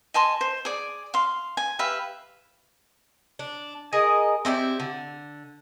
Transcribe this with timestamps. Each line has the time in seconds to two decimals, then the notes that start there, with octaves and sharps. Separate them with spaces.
0.14 D#5 G#5 A5 C6
0.41 C5
0.65 G#4 D5
1.14 F5 C6
1.57 G#5
1.79 G4 B4 E5 F5
3.39 D4
3.93 G#4 A#4 D#5
4.45 C4 E4 G4 D5
4.80 D3